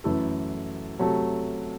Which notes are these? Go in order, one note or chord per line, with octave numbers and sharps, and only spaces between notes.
F#2 E3 A3 E4 A4
C3 F#3 A3